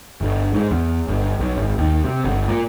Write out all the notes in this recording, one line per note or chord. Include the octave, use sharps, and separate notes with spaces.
G1
G#2
E2
G1
B1
G#1
D#2
C3
G1
A#2